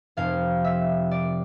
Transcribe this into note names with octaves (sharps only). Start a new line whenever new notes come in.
F1 F2 C3 F3 F5
E5
D5